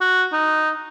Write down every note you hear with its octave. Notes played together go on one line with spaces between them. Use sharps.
F#4
D#4